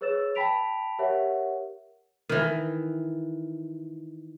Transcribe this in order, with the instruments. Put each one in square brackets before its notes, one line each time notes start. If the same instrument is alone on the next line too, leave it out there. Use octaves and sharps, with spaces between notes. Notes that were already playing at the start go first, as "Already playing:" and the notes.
[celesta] G#4 B4 C#5 E6 A6 E7
G5 A5 B5 B6 D7 F7
G4 A#4 C#5 E5 F#5
[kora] D#3 E3